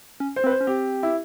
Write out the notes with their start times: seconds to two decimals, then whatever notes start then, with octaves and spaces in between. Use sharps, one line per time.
0.20 C#4
0.36 C5
0.44 C4
0.46 B4
0.51 C5
0.61 C#4
0.67 C4 G4
1.03 E4